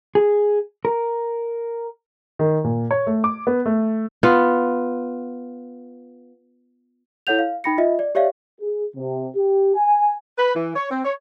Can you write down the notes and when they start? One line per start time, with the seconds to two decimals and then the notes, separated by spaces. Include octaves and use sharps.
0.15 G#4
0.85 A#4
2.39 D#3
2.64 A#2
2.91 C#5
3.07 A3
3.24 D6
3.47 B3
3.66 A3
4.23 B3 F4
7.27 E4 A4 C#5 F#5 G6 F7
7.39 F5
7.64 D#4 G5 B5 A#6 C#7
7.78 F4 D#5 E5
7.99 D5
8.15 G4 C#5 D5 E5 F5
8.60 G#4
8.95 C3
9.35 G4
9.75 G#5
10.38 B4
10.55 E3
10.76 C#5
10.91 C4
11.05 C#5